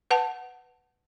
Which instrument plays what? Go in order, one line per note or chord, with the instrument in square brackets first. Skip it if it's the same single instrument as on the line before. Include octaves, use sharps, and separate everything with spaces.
[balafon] B4 F#5 A5